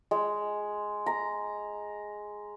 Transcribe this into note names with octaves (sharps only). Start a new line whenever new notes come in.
G#3
A#5